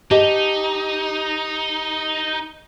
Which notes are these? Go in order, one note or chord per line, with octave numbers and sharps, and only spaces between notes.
D#4 G4 D#5 A5